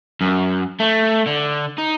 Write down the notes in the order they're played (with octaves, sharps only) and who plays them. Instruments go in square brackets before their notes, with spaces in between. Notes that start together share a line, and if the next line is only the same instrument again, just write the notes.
[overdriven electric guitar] F#2
A3
D3
D#4